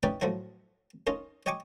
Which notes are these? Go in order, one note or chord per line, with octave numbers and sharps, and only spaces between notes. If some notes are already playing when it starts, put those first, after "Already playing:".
C#4 D#4 E4 G4 B4 D5
A2 F3 F#3 E4
C#4 D#4 F4 A#4
C#5 D#5 G5 G#5 C#6 D6